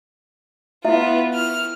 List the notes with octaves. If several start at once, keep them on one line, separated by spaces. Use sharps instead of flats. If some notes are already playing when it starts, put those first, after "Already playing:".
B3 E4 F4 E5
F6